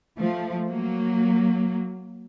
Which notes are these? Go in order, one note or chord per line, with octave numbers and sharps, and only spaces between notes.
F3 A3
F#3 A#3